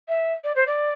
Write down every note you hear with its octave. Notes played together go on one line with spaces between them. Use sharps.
E5
D5
C5
D5